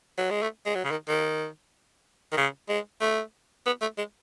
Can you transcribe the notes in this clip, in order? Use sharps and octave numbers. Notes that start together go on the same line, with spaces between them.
F#3
G#3
A3
G#3
F#3
C#3
D#3
D#3
D#3
C#3
G#3
A3
B3
A3
G#3